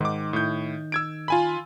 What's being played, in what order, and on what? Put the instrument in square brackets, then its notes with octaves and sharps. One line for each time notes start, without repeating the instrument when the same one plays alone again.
[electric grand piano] G#2 D6 [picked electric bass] D#3
[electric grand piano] A2 G6
E6 G#6 D7
F4 G#5 B5